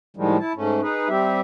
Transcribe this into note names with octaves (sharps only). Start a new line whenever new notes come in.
A2 D#3 F3 G3 G#3
E4 A5
G#2 A3 C#4
D#4 G#4 B4
G3 C4 G4 E5